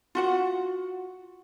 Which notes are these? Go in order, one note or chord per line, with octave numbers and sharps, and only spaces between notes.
F4 F#4 F#5